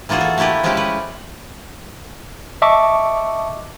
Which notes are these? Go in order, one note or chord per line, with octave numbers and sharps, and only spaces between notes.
E3 A#3 F4 F#4 G#4
A4
A3 A#3 E4 G4 B4
F3 G#3 A3 C#4 E4 G4
B4
D#5 E5 A5 C#6 D6